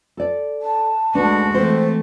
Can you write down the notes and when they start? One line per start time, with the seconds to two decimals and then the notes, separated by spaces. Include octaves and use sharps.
0.17 A4 D5
0.62 A5
1.15 D2 G#3 D4 F#4 B4
1.54 E3 A3 C4 C5